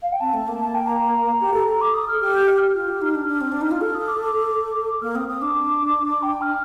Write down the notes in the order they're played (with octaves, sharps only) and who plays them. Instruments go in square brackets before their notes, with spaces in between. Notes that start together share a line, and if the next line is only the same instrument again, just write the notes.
[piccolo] F5
G5
[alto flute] C4 [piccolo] A5
[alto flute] A3
A#3
[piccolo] A5
G5
A#5
[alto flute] G4
A4
A4
[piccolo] D6
D#6
F6
[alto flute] G4 [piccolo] F6
[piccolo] G6
F6
F6
[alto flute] F4
G4
D#4
D4
D4
C4
D4
D#4
F4
[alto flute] A4 [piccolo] F6
[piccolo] D#6
D6
D#6
D6
[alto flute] A#3 [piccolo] F6
[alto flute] C4 [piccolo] D#6
[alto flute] C4 [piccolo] D#6
[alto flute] D4 [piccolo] D6
[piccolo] G5
F6